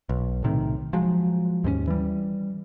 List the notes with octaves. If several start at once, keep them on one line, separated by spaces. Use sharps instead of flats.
B1
B1 A2 C3 D#3
F3 F#3 G#3
D#2 G#2 A#3 C#4
E3 G3